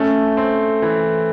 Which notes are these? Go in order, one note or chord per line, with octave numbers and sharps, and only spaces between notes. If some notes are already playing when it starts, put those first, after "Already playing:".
Already playing: A3 C#4
C4
E3